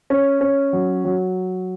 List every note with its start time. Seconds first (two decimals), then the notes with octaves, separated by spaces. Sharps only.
0.10 C#4
0.41 C#4
0.73 F#3
1.05 F#3